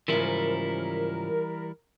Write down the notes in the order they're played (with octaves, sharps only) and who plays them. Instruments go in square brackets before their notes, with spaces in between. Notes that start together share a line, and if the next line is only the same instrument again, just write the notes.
[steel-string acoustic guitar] G#2 C#3 F3 [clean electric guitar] E3 G3 E4 [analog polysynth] A#4